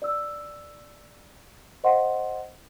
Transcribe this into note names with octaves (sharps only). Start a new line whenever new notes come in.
D5 E6
C5 D#5 F5 F#5 C6